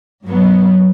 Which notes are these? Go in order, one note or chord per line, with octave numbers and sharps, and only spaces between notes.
G2 F#3 B3